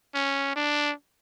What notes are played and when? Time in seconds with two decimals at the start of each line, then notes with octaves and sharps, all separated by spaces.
0.15 C#4
0.56 D4